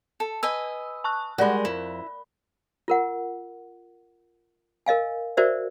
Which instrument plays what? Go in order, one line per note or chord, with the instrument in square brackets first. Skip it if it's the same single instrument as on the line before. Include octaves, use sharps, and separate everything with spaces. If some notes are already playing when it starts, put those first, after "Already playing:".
[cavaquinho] A4
[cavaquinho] B4 D#5 G#5 [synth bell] E6
[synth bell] A5 C#6 F#6
[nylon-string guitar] G3 G#3 [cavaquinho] F#4 [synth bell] A#4 D5 B5
[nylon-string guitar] F2 [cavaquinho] E4
[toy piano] F4 A#4 F#5
A#4 D#5 F5 G#5
F#4 A#4 C5 D5 E5